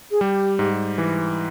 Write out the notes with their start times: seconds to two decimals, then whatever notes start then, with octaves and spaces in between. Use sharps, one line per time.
0.11 G#4
0.21 G3 G4
0.59 G#2
0.98 E3